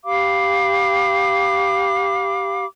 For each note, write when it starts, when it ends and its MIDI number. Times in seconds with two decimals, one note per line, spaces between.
0.04 2.65 67
0.04 2.65 77
0.04 2.65 83
0.04 2.65 86